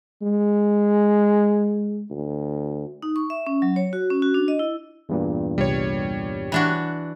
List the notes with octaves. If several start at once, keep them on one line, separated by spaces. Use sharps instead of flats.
G#3
D2
D#4
C#6
E5
C#4
F#3
C#5
F#4
C#4
F#4
D4
D#5
E4
E2 G2 A#2
C2 G3 C#5
E3 D4 F#4